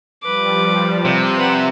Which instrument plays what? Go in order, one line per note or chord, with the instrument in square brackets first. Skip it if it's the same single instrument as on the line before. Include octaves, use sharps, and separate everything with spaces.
[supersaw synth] F3 G3 [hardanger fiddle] B4 D6
[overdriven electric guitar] C3 [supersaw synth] G5 C6 G6
[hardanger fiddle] B4 F#5 [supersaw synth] E5 C#7